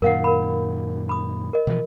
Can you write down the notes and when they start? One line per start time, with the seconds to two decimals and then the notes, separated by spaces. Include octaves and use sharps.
0.02 F#2 A#2 D#3 A#4 F5 F#5
0.24 A#4 B5
1.09 B5 D#6
1.53 A#4 D#5
1.67 B2 E3 F3